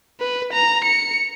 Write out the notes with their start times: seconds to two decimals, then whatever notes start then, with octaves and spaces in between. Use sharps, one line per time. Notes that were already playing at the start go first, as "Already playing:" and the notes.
0.20 B4
0.53 A#5
0.84 C#7